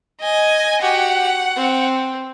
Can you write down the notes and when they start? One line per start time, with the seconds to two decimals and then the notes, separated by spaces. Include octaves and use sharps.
0.21 D#5 G#5
0.82 F#4 G4 F#5
1.56 C4